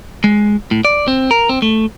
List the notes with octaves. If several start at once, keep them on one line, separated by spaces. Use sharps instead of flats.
G#3
A2
D5
C4
A#4
C4
A3